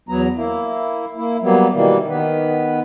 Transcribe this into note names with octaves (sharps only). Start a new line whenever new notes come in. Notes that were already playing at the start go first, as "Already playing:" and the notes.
E2 F#3 B3 A#5
A#3 E4
A#3 E4
F#3 G3 A#3 B3
B2 D#3 E3 G3 A#3
D#3 B3 B4